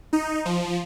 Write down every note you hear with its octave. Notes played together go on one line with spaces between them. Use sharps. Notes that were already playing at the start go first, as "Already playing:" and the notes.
D#4
F3